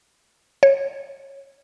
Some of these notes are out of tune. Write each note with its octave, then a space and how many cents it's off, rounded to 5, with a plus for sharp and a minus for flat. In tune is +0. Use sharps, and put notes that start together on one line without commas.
C#5 -15